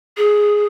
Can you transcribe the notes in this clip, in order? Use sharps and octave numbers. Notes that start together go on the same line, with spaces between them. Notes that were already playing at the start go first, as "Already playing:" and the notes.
G#4